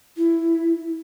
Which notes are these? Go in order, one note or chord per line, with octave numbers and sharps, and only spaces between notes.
E4